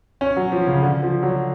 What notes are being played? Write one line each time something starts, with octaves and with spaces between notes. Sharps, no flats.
C#4
F#3
F3
C#3
D3
F3
F#3